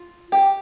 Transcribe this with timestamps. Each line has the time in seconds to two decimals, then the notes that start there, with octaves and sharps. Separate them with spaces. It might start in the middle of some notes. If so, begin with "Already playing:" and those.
Already playing: F4
0.32 G4